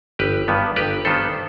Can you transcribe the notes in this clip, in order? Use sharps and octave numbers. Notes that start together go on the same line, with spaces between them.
G1 G4 B4
G2 D#3 G3 B3
G1 G4 B4
G2 D#3 G3 B3 A4 C5